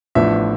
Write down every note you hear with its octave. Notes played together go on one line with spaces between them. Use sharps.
A1 A2 F3 B3 D4 E5